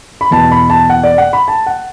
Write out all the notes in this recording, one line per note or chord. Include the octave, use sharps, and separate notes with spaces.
B5
E2 B2 B3 A5
B5
A5
F#5
D5
F#5
B5
A5
F#5